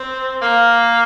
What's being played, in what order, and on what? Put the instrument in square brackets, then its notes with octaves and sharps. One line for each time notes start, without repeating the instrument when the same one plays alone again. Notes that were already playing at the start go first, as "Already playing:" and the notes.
Already playing: [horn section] C4
A#3